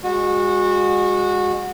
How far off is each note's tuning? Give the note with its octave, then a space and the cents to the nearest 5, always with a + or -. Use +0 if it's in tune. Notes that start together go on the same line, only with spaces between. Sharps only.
G#3 -35 F#4 -20